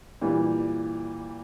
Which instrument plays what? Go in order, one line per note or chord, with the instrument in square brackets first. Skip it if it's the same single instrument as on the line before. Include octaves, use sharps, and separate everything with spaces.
[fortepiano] A#2 E3 G3